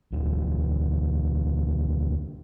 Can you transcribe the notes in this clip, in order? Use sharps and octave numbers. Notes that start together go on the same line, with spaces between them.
E1 D2